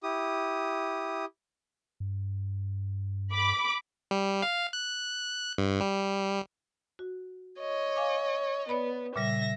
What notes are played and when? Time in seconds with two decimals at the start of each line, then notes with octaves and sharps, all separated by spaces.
0.03 E4 G4 D#6
2.00 G2
3.32 B5 D6
4.11 G3
4.42 F5
4.73 F#6
5.58 G2
5.81 G3
6.99 F#4
7.60 C#5 D#5
7.96 F5 G#5 D6
8.69 B3 C#5 D5 B5
9.16 A#2 C#3 G3 E5 A#6